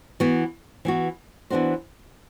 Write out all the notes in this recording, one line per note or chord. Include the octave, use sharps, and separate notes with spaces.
E3 B3 F#4
E3 B3 F#4
E3 B3 D4 F#4 C5